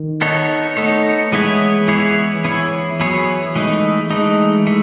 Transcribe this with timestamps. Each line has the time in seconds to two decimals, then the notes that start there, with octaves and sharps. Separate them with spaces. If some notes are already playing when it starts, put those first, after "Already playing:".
Already playing: D#3
0.21 B3 D#4 A4 C#5
0.77 A3 B3 D#4 A4 C#5
1.32 E3 G#3 B3 E4 G#4 C#5
1.88 E3 B3 E4 G#4 C#5
2.44 E3 B3 E4 G#4 C#5
3.00 E3 F#3 B3 E4 G#4 C#5
3.55 E3 G#3 A3 D#4
4.10 E3 G#3 A3 D#4
4.67 E3 A3